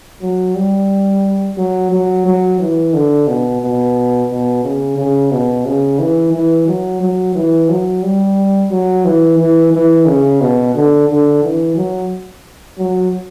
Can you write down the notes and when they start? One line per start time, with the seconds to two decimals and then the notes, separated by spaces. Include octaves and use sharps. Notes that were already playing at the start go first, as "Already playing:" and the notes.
0.22 F#3
0.56 G3
1.58 F#3
1.92 F#3
2.26 F#3
2.60 E3
2.94 D3
3.28 B2
3.62 B2
4.30 B2
4.64 C#3
4.98 C#3
5.32 B2
5.66 C#3
5.99 E3
6.33 E3
6.68 F#3
7.01 F#3
7.36 E3
7.69 F#3
8.03 G3
8.71 F#3
9.05 E3
9.39 E3
9.73 E3
10.07 C#3
10.41 B2
10.75 D3
11.09 D3
11.43 E3
11.77 F#3
12.79 F#3